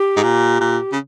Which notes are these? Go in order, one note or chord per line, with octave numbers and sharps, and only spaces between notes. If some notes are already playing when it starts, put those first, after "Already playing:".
Already playing: G4
G#2
A#2
A#2
C#3